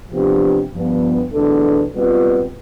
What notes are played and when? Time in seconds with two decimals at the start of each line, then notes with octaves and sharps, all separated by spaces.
0.11 C3 F3 B3 D4 G4
0.71 G2 F3 B3
1.32 E2 B2 A3 D4 A4
1.93 B2 G3 C4 F4 B4